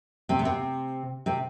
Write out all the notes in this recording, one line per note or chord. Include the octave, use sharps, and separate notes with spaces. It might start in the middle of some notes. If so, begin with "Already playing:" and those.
C3 C4
B3
C3 C4
C3 C4